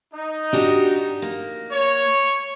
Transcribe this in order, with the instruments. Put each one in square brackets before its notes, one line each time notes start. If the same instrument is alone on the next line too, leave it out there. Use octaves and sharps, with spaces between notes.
[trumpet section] D#4
[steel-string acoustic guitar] D4 F#4 G4
A#3
[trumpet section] C#5